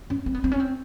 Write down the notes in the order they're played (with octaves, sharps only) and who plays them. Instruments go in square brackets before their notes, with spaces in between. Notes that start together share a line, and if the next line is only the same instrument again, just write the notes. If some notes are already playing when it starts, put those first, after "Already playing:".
[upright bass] C#4
C4
B3
C4
C#4
C4